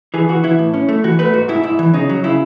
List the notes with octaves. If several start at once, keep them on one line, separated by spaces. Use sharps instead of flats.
E3 G#4
E3 F#4
E3 E4
A2
C#4
A3
E3 F#4
A3 B4
G#2 F#4
G#2 E4
G#2 E4
E3
C#3 D#4
F#3
C#3 E4